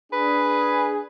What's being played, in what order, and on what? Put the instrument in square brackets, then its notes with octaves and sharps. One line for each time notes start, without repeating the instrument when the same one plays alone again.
[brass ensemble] D4 G#4 [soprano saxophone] B4